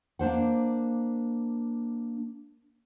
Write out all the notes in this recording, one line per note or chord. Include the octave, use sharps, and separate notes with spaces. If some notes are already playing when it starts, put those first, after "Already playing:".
A#3 D4 C5 F#5